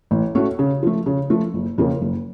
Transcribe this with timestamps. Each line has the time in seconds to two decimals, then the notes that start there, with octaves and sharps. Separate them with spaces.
0.11 A1
0.35 A2 A3 C#4 F#4
0.59 C#3
0.83 F3 A3
1.06 C#3
1.30 F3 A3
1.54 F#1
1.78 F2 C#3 F3 A#3
2.02 F#1